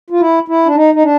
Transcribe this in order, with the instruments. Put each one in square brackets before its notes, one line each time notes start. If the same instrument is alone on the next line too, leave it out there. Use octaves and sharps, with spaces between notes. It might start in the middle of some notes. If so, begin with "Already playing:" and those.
[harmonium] F4
E4
E4
D4
D#4
D#4
D4